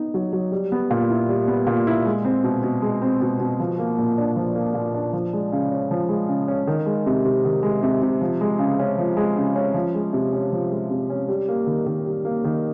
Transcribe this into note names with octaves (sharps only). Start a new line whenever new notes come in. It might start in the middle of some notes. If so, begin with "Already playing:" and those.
Already playing: B3 D#4
F#3
F#3
G3
B3
A#2
E4
G3
B3
A#2
E4
G#3
C4
B2
B2
G#3
C4
B2
B2
F3
A#3
A#2
D4
F3
A#3
A#2
D4
F3
G#3
C#3
C#4
F3
G#3
C#3
C#4
D#3
G#3
C3
C3
D#3
G#3
C3
C3
F3
G#3
C#3
C#4
F3
G#3
C#3
C#4
F3
G#3
C3
C#4
F3
G#3
C3
C#4
G3
A#3
D#3
D#3
G3
A#3
D#3